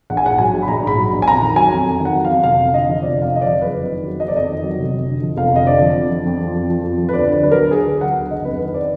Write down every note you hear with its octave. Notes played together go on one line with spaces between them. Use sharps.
A#1 F#5
G#5
G#2 F#5
F#3 G#5
A#1
B5
A#1 A#5
G#2 B5
F#3
A#1
G#5
F2 A#5
D#3
F#3 G#5
F2
F2
D#3
F#5
F#3
F5
F2
F1 F5
F2
D3 D#5
F3
F1 D5
F2 F5
D3 D#5
F3 D5
F#1 B4
F2
D#3
F#3
F#1 D#5
D5
F2 D#5
D#3
F#3
F1
F2
D3
F3
F1 F5
F2 D#5
D3 D5
F3
F2
F3
F2
F3
F2
F3
F2
F3
B4
D2 D5
D3 D5
F#3 B4
A#4
D2
D2 G#4
D3
F#3 F#5
D2
F#1 D#5
F2 B4
D#3 B4
D5